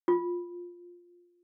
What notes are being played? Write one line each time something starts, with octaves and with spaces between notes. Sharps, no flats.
F4